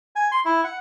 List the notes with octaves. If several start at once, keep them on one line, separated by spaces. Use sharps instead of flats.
G#5
C6
E4
F#5